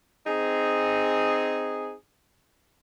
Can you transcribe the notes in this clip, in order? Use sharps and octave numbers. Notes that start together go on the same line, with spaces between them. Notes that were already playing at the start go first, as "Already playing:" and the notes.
C4 D#4 G#4